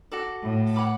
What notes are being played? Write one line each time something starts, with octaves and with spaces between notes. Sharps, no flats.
F#4 A4 D5
A2
C#5 F#5 B5 D6